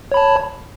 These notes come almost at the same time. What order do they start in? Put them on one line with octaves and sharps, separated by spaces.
C#5 B5 A5